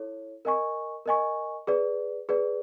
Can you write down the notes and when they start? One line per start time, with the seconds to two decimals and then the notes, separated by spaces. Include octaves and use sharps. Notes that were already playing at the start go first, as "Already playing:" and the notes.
Already playing: E4 A4 C#5
0.45 A#4 D#5 G#5 C#6
1.06 A#4 D#5 G#5 C#6
1.67 G#4 B4 D5
2.29 G#4 B4 D5